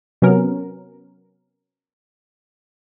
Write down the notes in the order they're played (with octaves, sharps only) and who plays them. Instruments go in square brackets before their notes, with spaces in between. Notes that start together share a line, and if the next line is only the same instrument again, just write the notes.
[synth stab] C3 F#3 B3 C#4 A#4